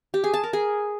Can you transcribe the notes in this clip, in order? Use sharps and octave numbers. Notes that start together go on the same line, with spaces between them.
G4
G#4
A5
A#4
G#4